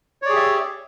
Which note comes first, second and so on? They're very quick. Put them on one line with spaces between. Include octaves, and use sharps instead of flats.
C#5 D5 G#4 G4 E5